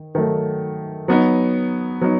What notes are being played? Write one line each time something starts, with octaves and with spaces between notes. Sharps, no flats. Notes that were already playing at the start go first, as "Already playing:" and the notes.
Already playing: D#3
D#3 F#3 A3
F#3 B3 D#4
F#3 B3 D#4